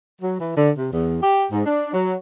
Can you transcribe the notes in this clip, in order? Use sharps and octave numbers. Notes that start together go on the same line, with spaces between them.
F#3
E3
D3
C3
E2
G4
G#2
D4
F#3